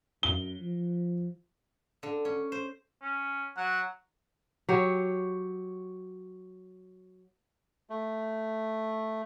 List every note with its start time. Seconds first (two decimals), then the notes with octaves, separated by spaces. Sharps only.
0.23 F#2 G7
0.60 F3
2.03 D3
2.25 C#4
2.52 C5
3.02 C#4
3.57 F#3 F#5
4.69 F#3 G4 C#5
7.90 A3